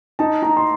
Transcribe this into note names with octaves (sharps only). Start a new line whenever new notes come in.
D#4 A5
D#4 A#5
C6